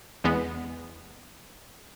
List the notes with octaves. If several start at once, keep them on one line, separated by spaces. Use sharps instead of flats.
E2 G#3 B3